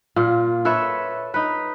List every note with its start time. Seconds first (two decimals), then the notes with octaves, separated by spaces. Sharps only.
0.16 A#2 F4
0.65 A4 B4 C#5 E5
1.34 D#4 B4